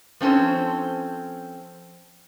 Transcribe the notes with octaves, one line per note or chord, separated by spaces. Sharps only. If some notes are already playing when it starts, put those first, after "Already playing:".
F3 C4 C#4 A4 C5